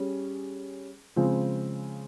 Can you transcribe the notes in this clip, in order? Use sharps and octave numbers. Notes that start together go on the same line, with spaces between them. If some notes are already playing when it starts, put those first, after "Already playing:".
Already playing: G3 C#4 G#4
C#3 F3 G#3 C4